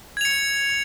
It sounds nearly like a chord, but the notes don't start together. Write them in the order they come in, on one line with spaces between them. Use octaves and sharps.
G#6 F7 C#7